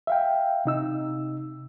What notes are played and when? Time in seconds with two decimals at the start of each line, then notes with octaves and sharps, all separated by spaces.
0.07 E5 F5 G5
0.65 C3 D#4 E6